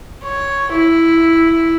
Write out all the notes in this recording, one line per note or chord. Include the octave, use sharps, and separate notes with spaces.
C#5
E4